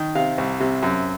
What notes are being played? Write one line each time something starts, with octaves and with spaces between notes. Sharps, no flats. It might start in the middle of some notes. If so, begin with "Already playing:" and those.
Already playing: D#3
C3 F5
C2
C3
F#2